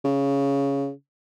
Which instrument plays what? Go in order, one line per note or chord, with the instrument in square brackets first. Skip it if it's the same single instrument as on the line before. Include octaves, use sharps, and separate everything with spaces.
[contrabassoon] C#3